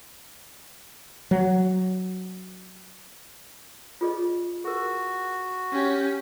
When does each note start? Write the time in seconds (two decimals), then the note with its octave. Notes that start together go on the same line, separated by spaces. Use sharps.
1.31 F#3
4.01 F4 G#4 D#5
4.64 F#4 G#4 A#4
5.73 C#4 G4